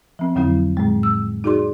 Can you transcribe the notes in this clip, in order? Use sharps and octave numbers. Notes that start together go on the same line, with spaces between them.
F3 C4
F2 D3 F#3 C4 E4
A2 G#3
E6
D#4 F#4 G#4 D5 C6 D6